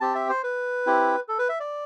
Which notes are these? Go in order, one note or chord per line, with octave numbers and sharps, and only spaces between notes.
C4 G4 A5
E5
C5
B4
C4 E4 G4
A4
B4
E5
D5